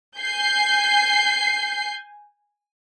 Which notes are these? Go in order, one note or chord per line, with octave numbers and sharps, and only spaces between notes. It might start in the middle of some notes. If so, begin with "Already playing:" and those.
G#5 G6 C7